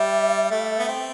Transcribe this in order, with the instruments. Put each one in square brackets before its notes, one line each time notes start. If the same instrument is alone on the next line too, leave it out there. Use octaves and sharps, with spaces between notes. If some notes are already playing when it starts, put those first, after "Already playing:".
Already playing: [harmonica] G3 [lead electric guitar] E5
[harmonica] A3
B3
C4